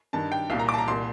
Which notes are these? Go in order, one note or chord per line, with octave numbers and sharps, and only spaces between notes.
G2 D#3 A5
G5
C2 A#2 F5
A#5
D6
A5
A#5
C2 A#2 C6